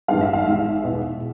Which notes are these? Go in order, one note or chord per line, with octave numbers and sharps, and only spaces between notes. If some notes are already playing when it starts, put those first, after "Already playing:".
A1 G2 D#3 G#3 B3 F5
E5
F5
A1 G#2 D#3 G#3 E5
E2 B2 G#3 B3